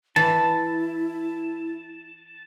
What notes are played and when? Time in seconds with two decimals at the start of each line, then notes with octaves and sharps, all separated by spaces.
0.16 E3 E4 A5